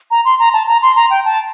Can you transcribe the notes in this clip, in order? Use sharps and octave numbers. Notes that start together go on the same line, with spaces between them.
A#5
C6
A#5
A5
A#5
C6
A#5
G5
A5